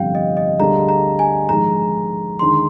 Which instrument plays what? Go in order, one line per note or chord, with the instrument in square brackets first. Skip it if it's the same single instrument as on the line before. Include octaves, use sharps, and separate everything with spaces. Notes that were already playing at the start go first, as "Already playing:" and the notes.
Already playing: [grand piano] G1 F2 C3 G3 [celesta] F5 G5
[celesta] D#5
D#5
[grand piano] D2 D3 G3 D4 G#4 [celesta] A#5
[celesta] A#5
G#5
[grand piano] A#1 G#2 D#3 G#3 D#4 [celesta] A#5
[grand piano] D#2 D3 G#3 D#4 [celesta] C6